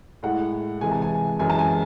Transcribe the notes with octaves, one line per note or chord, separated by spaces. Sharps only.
A2 G#3 F#5
C3 E3 G#3 G#5
A5
G#5
F#2 E3 G#3 G#5
A5
G#5